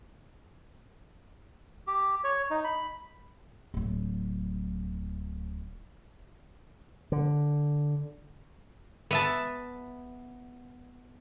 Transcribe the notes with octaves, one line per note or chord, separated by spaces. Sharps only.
G4
C#5
D#4
B5
D1 F#3
D3
B3 E5 A5